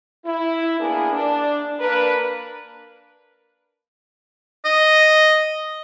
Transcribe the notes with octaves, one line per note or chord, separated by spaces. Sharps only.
E4
A#3 B3 D4 E4 G#4 A#4
D4
A#3 D4 A#4 B4
D#5